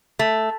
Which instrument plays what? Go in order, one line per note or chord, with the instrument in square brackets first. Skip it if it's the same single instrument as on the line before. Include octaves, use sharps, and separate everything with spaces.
[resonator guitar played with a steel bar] A3